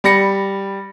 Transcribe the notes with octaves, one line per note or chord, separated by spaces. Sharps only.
G3 B5 A#6 C#7